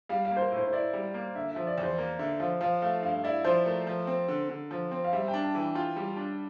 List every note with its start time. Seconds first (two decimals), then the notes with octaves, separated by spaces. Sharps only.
0.09 G3 F5
0.25 F5
0.31 A#3
0.36 C5
0.41 A#4
0.52 A2 C5
0.67 C5
0.73 E4 D5
0.93 G3
1.14 A#3
1.35 D3 E5
1.51 F3 E5
1.67 D5
1.78 E2
1.83 C5
1.98 A#3 A#4
2.19 D3 E5
2.40 F3 F5
2.61 F3 F5
2.82 A3 F5
3.03 G2 F5
3.24 E4 D5
3.44 F3 C5
3.66 A3 A#4
3.87 F3
4.07 C4
4.28 D3
4.50 D3
4.71 F3
4.91 C4
5.04 F5
5.12 G3 E5
5.28 G5
5.34 D4
5.44 A5
5.55 E3
5.60 G5
5.75 F4 G5
5.96 G3
6.17 D4